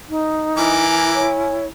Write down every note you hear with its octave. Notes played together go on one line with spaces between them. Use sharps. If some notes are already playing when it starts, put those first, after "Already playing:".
D#4
E3 E4 A#4 G#5 D6
C#5